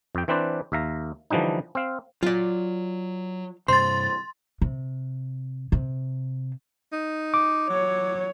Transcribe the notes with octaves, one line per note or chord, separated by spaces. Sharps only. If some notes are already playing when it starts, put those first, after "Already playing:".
F2 G5
E3 C4 D4 B4 C5 D5
D#2 E5 F5 A#5
D3 E3 F3 G3 D4 D#4
C4 F5
F#3 F4 D5
G2 C3 C5 C6 A6
C3
C3
D#4
D6
F#3 C#5